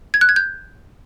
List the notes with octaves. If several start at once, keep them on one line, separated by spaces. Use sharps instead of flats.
G#6
F#6
G#6
G6